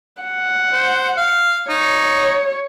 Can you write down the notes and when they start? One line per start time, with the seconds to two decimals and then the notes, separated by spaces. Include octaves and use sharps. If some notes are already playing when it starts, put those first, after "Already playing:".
0.22 F#5
0.73 C5
1.17 F5
1.69 D#4 C#5